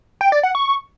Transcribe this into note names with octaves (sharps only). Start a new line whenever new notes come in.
G5
D5
F#5
C#6